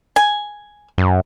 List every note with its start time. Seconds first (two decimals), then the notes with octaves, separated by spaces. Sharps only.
0.16 G#5
0.98 F#2